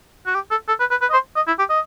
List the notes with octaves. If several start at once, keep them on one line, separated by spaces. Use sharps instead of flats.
F#4
G4
A4
A4
B4
B4
B4
D#5
C5
D#5
E4
G4
D#5